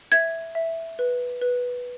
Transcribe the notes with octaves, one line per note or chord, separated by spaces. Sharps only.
E5 G#6
E5
B4
B4